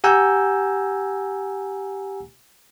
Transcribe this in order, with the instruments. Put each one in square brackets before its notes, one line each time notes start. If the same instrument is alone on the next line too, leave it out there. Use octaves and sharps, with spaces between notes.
[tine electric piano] G4 F#5 G#5 A#5 E6 G6